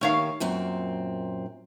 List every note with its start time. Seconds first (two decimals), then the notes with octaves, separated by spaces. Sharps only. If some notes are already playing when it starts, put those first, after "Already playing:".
0.01 D#2 D#3 A3 G4 C#5 F5
0.40 F#2 A#2 C4